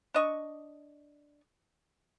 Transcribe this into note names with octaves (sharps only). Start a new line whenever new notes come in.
D4 D#5 C#6